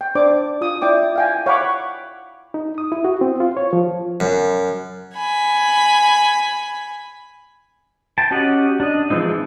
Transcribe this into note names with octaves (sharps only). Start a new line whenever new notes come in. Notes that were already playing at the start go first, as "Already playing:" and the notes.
G5
D4 C5 D5 D6
F4 D#6
E4 D5 G5 D6
F5 G5 G#5
C#5 F5 F#5 B5 C#6 D6
D#4
D#6
E4
F#4
C4
F4
C#5
F3
F#2
G#5 B5
G5 A5
C#4 F#4 G4 D#5 F#5
D4 D#5
E3 F3 G#3 C4 D#4